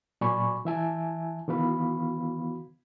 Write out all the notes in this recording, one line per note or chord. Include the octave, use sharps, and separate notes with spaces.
A#2 F#3 D5 G#5 B5 C#6
E3 E5 G#5 A5
D#3 E3 B3 F#4 F5 B5